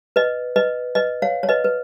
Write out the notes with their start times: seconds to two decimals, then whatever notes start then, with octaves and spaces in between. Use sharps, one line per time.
0.16 B4 D#5
0.56 B4 D#5
0.95 B4 D#5
1.22 C#5 F5
1.43 C#5
1.49 B4 D#5
1.64 B4